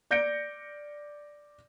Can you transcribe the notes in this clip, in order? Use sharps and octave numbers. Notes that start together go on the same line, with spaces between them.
D5 G6 A#6 C#7 D7